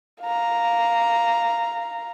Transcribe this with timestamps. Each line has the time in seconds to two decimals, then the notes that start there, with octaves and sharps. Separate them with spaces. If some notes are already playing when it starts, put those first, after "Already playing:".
0.23 F5 A#5